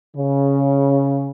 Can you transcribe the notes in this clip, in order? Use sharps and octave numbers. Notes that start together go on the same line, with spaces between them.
C#3